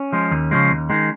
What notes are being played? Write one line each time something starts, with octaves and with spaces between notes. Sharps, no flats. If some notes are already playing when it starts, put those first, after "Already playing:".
Already playing: C#4
F3 G#3
D#2
C#3 F3 G#3
D#2
D#3 G#3